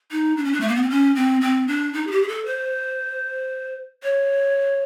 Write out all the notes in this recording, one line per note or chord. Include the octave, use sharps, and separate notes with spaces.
D#4
D4
C#4
D4
A3
A#3
B3
C4
C#4
C4
C4
D4
D#4
G#4
G4
G#4
A4
C5
C#5